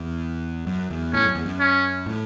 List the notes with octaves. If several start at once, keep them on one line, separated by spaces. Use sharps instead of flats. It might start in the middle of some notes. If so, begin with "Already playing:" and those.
Already playing: E2
F#2
E2
A2 C#4
F#2
E2
F#2
C#4
A2